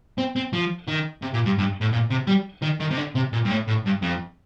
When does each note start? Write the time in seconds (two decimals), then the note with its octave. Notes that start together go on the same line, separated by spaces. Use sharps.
0.18 C4
0.36 C4
0.53 F3
0.88 D#3
1.22 C3
1.34 A#2
1.46 G2
1.58 G2
1.81 A2
1.92 A#2
2.10 C3
2.27 G3
2.62 D#3
2.80 D#3
2.90 C3
2.97 D3
3.15 C3
3.33 A#2
3.44 G2
3.50 A2
3.67 A2
3.85 G2
4.02 F2